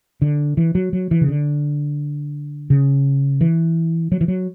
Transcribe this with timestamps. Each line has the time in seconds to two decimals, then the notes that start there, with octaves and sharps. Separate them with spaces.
0.22 D3
0.57 E3
0.75 F#3
0.93 F#3
1.11 E3
1.21 C#3
1.28 D3
2.70 C#3
3.41 E3
4.12 F#3
4.21 E3
4.28 F#3